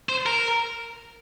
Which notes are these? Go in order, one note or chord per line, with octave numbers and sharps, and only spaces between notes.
C5
A#4